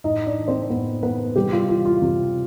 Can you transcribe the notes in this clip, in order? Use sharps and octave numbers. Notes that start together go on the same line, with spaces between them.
A2 D#4 D#5
D4 D5
E3
C4 C5
A2 B3 B4
E3 B3 B4
C3 G3 G4
F4
E3 F4
F4
C3